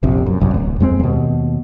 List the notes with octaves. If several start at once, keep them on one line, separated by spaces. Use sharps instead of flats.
F1 A#1 C3
F#2
G1 C2 F#2
D1
F2 G#3 C4
D#2 B2